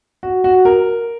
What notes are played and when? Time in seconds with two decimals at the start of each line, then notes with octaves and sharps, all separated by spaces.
0.23 F#4
0.44 F#4
0.65 A#4